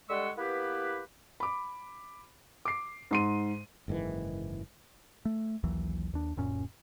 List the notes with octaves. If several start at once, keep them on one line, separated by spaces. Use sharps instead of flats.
D3 G3 G#3 F#5 C#6 E6
A#3 B3 E4 G4 B4
B5 D6
D6 C7
G#2 C6 D#7
F#1 G#2 D#3 E3
A3
A#1 D#2 E3 F#3
D#2 D4
D1 F#2 A#2 C#4